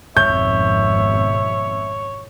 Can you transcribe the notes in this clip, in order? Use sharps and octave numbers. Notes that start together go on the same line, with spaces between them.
G#1 F2 B2 C#5 E5 G6